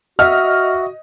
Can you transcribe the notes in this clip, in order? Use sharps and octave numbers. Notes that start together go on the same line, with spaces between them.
F#4 D#5 E5 F#5 F6